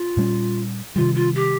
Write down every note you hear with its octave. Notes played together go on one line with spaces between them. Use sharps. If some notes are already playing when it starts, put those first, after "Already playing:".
Already playing: F4
A#2 G3 A#3 C#4
C3 D#3 G3 F4
F4
G4